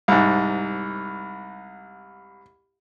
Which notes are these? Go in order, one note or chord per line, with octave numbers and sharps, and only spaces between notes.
C2 G#2